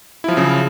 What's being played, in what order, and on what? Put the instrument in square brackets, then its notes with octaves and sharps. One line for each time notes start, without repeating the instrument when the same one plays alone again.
[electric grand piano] E4
F3
F#3
C#3